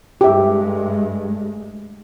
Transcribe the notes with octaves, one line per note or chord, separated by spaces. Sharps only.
G2 G#3 A3 G4 E5